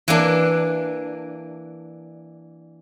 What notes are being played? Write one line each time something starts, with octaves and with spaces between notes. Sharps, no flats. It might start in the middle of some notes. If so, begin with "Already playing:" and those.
E3 A#3 D4